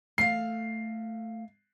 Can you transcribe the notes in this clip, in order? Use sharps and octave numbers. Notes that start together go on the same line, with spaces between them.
A3 F5 C7